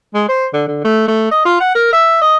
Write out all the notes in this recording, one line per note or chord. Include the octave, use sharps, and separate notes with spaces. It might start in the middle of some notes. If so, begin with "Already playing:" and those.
G#3
C5
D3
D3
A3
A3
D#5
F4
F#5
A#4
E5
D#5